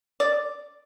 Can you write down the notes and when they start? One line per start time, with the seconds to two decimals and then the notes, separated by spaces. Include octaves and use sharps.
0.20 D5